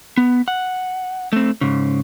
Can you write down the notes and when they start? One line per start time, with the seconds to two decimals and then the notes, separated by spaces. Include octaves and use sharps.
0.17 B3
0.48 F#5
1.33 A3 C4
1.61 G#2 C#3